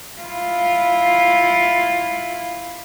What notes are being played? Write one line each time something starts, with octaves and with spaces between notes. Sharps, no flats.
E4 F4